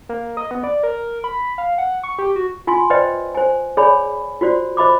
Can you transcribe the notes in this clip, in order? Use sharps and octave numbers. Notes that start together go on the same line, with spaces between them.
A#3
D#5
B3
D5
A#4
B5
F5
F#5
C#6
G4
F#4
F4 G#5 C6
B4 C5 D5 D#5 G5
C5 G#5
G#4 C#5 D5 G#5 B5
F4 F#4 C5 D5
C5 D#5 B5 D6